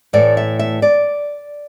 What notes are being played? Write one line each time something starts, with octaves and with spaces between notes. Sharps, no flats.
A2 E3 A3 D5
E5
E5
D5